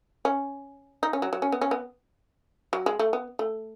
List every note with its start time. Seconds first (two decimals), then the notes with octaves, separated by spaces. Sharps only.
0.25 C#4
1.03 D#4
1.13 C#4
1.22 F#3
1.33 F#3
1.42 C#4
1.52 B3
1.61 C#4
1.71 B3
2.73 F#3
2.86 G#3
2.99 A3
3.13 B3
3.39 A3